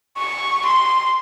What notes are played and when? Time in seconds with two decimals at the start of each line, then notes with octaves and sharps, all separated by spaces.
0.18 C#6
0.66 C6